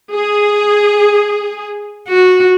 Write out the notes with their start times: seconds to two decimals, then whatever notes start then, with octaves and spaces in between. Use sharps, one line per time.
0.11 G#4
2.08 F#4